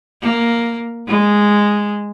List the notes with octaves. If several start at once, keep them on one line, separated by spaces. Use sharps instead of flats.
A#3
G#3